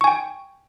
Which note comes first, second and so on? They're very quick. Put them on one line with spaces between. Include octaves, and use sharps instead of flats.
C#6 G#5 G5